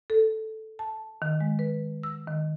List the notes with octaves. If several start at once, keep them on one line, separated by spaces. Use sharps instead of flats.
A4
A5
D#3
G#3
B4
E6
D#3